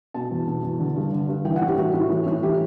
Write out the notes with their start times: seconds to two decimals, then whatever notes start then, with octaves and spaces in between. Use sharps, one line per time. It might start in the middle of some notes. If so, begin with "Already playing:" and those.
0.14 B2 A5
0.31 E2
0.47 B2
0.63 E2
0.80 D3
0.96 G2
1.13 D3
1.29 G2
1.45 E3 G5
1.56 F#5
1.62 A2
1.67 G4
1.78 E3 F#4
1.94 A2
2.10 E3
2.27 A2
2.43 E3 G4